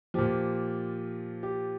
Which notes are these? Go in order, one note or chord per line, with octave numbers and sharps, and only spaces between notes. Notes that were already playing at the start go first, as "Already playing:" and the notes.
A#2 F3 G4
G4